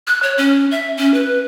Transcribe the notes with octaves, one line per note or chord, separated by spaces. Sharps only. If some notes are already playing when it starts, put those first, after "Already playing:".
F#6
C#5
C#4
E5
C#4
B4